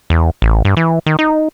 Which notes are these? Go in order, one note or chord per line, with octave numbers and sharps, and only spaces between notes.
E2
A1
G2
E3
D#3
D#4